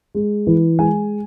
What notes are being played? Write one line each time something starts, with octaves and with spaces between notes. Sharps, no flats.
G#3
E3
G#3 G#5